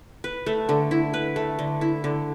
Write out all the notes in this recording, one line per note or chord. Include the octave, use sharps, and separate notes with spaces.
B4
A3
D3
E4
B4
A3
D3
E4
D3